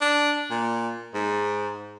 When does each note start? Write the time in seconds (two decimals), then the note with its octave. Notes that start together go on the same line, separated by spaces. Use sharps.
0.01 D4
0.51 A#2
1.14 G#2